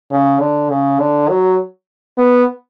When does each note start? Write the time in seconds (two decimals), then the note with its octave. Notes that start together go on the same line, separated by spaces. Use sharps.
0.11 C#3
0.40 D3
0.70 C#3
0.99 D3
1.29 F#3
2.18 B3